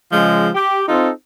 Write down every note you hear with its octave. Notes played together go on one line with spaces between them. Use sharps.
C#3 F3 G#3
G4
C4 D#4 F4 A4